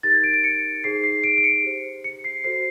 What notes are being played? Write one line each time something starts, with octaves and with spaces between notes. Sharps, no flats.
D#4 G4 A#4 A6
G#6
D7
D7
C#7
D#4 G#4 C5 C7
C7
D7
D7
C#7
G4 C5
C#7
C7
F#4 A4 C5 C7